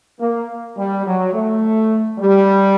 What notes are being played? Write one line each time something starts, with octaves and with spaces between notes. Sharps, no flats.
A#3
G3
F#3
A3
G3